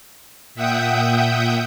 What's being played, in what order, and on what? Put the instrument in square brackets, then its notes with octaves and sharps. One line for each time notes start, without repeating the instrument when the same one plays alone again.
[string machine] A#2 E5 F#5 G5 D#6 G6